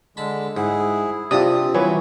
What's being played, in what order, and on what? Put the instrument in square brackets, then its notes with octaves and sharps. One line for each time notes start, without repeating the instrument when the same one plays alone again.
[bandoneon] D3 G#3 [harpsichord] A5 B5
[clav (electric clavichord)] G#2 [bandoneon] E4 G#4 [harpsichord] F#5
[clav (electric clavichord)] C3 D4 D5 [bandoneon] C4 [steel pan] F4 D#6 [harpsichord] G4
[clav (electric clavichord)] E3 F#3 [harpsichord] G3 [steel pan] B4 C#5 G#5